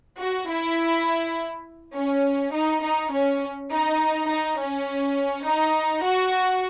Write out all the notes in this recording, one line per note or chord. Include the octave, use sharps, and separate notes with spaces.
F#4
E4
C#4
D#4
D#4
C#4
D#4
D#4
C#4
D#4
F#4